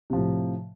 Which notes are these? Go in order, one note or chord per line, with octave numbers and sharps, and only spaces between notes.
A2 C3 F3